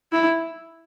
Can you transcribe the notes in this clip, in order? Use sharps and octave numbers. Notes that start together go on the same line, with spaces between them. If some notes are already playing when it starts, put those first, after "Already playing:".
E4